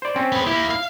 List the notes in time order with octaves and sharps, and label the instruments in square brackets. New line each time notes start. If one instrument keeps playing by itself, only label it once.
[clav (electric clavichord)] C5 D5
C4 C#4
[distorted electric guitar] B3 G#4
[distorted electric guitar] A#3 G4 [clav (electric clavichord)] E4
[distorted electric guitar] F5